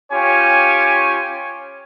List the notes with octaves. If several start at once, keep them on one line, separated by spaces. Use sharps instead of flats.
C#4 F4 G4 C#5 G#5